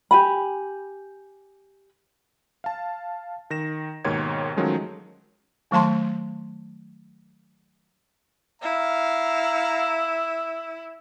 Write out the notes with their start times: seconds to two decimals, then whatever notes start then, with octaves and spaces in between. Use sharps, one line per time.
0.11 G4 G#5 B5
2.64 F5 A5
3.50 D#3 A#6 E7
4.04 D#2 G#2 B2 D#3 C#5 G#6
4.57 D#3 F3 F#3 G#3 A3 C#4
5.71 D#3 F#3 A3 A5 C6
8.62 E4 F5 A#5